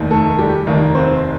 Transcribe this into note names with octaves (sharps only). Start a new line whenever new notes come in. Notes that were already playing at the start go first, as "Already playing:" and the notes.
Already playing: F1 D#2 D#3 A#3
A3 A4
G3 G4
F1 D#2 D#3 A#3 A#4
C4 C5